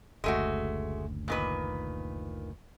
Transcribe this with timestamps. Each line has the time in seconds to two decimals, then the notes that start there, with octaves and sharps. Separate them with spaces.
0.24 F#1 D2 G#3 A3 F#4
1.28 A#2 D#3 B4